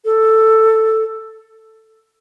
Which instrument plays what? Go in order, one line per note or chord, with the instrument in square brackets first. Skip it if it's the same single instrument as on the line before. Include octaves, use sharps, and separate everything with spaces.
[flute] A4